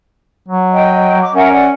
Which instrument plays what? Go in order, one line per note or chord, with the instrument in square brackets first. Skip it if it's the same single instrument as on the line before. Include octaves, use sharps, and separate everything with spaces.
[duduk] F#3
[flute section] D#5 G5
D6
[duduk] C#4 [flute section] A#4 E5 F#5
[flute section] D5 F#5